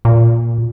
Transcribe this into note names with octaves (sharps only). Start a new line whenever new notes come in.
A#2